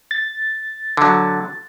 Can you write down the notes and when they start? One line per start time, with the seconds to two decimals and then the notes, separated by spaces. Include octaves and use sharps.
0.11 A6
0.97 D3 F#3